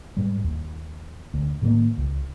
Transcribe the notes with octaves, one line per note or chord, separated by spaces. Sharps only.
G#2 G3
D#2
D2
A2 D#3 F#3 A#3
C#2